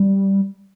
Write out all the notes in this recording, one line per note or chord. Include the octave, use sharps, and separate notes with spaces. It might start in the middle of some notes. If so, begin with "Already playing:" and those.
Already playing: G3